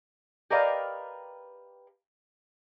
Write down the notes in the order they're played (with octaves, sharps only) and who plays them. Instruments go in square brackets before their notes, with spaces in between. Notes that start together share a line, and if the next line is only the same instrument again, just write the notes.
[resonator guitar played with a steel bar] G4 A#4 B4 D5 D#5 F5